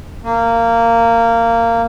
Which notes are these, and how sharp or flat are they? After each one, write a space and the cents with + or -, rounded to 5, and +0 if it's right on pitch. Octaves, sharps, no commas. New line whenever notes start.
A#3 -15